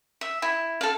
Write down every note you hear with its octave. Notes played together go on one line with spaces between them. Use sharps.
E5
E4
A4 F5